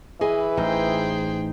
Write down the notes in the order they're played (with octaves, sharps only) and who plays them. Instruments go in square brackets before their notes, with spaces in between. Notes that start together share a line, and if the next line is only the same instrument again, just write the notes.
[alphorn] E3 [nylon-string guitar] G#4 D#5 G#5 [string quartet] B4
[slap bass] A1 [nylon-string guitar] D#4 [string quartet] G#4 C5 G5